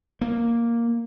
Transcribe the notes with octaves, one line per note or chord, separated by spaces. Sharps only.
A#3